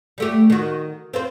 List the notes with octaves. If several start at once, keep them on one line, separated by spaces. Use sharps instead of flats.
G3 A3 G4
D#3 F#4
C4 F4 C5